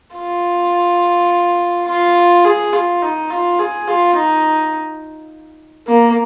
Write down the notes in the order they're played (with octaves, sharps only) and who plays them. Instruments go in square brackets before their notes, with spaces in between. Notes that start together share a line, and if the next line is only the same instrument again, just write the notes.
[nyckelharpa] F4
F4
G#4
F4
D#4
F4
G#4
F4
D#4
A#3